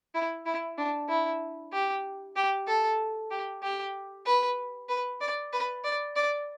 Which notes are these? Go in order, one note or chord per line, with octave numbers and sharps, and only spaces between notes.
E4
E4
D4
E4
G4
G4
A4
G4
G4
B4
B4
D5
B4
D5
D5